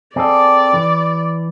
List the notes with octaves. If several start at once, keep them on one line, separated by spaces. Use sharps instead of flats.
C4 G#4 A4 D5
E3